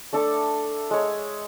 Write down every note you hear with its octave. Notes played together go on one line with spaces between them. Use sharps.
A3 D4 A4 D6
G#3 C#5